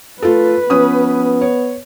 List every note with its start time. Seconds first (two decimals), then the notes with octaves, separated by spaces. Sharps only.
0.22 A3 F4 A4 B4
0.70 F3 B3 C#4 D#6
1.41 C#5